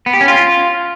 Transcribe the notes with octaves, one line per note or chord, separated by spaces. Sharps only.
B3
G4
C#4
F4